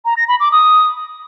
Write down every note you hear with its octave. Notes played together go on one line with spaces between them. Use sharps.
A#5
A#6
B5
D6
D#6